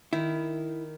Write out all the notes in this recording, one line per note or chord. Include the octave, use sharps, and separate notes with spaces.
D#3 E4